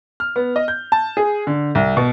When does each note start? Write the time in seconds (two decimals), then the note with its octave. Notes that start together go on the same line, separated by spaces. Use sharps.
0.20 F6
0.36 B3
0.56 D#5
0.68 G6
0.92 A5
1.17 G#4
1.47 D3
1.75 C2
1.97 B2